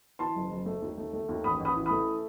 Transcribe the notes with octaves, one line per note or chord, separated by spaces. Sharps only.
E3 A5 C6
F#1
F#1
A3
D#2
A3
A3
D#2
A1 B5 D#6
A1
B5 D#6
E3
A3 B5 D#6